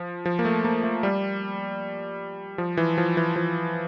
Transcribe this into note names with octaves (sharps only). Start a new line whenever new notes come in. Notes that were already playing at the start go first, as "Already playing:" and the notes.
Already playing: F3
F3
A#3
A3
A#3
A3
G3
F3
E3
F3
E3
F3